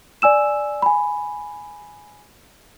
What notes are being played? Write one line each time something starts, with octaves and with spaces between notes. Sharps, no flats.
D5 G#5 E6 E7
G#5 B5